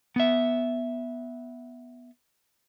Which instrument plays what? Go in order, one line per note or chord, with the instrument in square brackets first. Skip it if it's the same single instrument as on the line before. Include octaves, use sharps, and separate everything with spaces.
[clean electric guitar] B3 E5